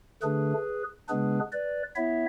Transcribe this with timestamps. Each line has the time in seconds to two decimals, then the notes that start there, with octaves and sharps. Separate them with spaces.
0.22 D3 A3 D4 G#4 B4
1.09 C#3 G#3 B3 D4 G#4 B4
1.52 B4 D5
1.96 B3 E4 C#5 E5